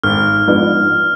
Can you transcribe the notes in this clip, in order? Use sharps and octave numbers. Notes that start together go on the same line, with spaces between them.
G#1 F6
G#2 F3 B3 D4